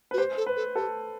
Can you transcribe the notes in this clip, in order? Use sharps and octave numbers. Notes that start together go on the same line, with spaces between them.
F#4 B4
G4 C5
A4
B4
A4
G4 A4